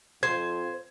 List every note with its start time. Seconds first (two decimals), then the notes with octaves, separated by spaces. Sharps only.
0.23 F2 C5 G#6